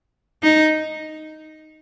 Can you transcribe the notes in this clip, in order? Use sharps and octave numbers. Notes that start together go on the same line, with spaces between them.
D#4